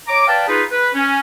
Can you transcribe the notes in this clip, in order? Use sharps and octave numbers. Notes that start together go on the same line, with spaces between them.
C#5 D#5 A#5 D6
B4 D5 F5 G5 A5
D#4 F4 G#4 B4
B4
C#4